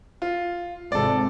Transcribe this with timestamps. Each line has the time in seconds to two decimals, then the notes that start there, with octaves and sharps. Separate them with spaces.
0.22 F4
0.92 G#1 C3 A4 D5